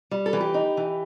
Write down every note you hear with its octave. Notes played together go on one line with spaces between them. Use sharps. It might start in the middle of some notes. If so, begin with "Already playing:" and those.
G3
A4
E3
G4
D#4
E3